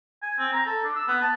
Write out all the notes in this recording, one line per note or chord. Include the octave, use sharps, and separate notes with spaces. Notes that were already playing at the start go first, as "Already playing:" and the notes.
G#5
C4
A#5
A4
D4
E6
B3
A5